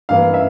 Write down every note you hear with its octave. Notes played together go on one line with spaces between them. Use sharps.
G2 E3 A#3 F5
E5